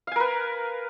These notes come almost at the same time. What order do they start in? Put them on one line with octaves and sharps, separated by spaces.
F5 G#5 A#4 B4